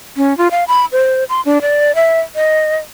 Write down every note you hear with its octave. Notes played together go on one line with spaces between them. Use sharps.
C#4
F4
F5
B5
C5
C6
D4
D5
E5
D#5